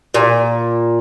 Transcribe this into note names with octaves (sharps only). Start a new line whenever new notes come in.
A#2